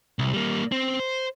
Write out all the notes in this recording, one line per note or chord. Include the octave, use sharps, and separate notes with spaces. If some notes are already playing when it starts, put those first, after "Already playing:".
C2
G3 A#3
C4
C5